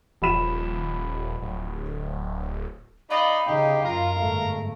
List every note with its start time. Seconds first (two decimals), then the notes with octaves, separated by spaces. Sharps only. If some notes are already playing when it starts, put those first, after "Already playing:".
0.22 D#1 F3 B5 E7
1.42 D1
3.10 D#4 D5 D#5 F5 B5
3.46 C#3 D#4 G4
3.85 F#2 F4 A#4
4.20 G1 G#2 A3